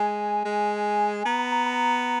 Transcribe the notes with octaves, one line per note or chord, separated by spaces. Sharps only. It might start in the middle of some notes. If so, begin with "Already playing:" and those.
Already playing: G#3 G#5
G#3
B3 A#5
A#5
A#5
A#5